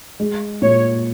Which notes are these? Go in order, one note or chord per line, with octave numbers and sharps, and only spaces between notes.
G#3
A#2 C#5